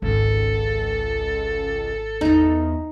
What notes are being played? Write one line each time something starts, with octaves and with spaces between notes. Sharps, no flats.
G#1 C#2 A4
E2 D#4 A#5